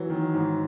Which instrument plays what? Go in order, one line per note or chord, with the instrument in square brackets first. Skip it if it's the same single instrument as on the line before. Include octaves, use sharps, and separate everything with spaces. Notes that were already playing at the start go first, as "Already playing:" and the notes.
Already playing: [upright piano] E3 F#3
D#3
G#2